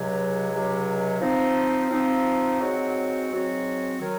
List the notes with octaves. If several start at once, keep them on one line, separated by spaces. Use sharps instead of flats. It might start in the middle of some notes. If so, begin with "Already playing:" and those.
Already playing: C#2 C3 F#3
C#2 C3 F#3
F3 C4 D#4
F3 C4 D#4
G#2 F#3 C4 F#4
G#2 F#3 C4 F#4
D#3 F#3